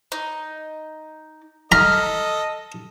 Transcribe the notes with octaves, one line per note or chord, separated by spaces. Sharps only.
D#4
A4 D#5 A#5 F6